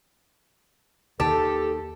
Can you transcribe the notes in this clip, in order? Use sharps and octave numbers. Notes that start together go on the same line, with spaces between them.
D#2 D#3 G4 A4 A5